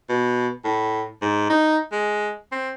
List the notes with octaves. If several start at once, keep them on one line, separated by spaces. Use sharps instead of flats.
B2
A2
G#2
D#4
G#3
C4